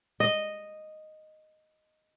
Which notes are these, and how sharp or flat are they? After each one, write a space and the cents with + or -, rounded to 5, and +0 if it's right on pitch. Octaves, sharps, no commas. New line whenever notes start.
D#5 -5